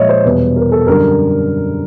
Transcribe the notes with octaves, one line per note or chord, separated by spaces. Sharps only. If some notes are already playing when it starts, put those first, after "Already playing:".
Already playing: A#2 F3 G#3 C#5 D#5 E5
C5
E2 B2 G3 B4
A#4
A4
F#2 D3 G3 A#4